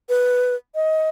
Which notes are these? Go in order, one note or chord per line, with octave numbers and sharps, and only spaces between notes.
B4
D#5